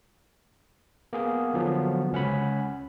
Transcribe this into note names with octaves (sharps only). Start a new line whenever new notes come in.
A#3 B3 G#4
D3 F3 F#3 B3
C#2 C#4 F#5 B5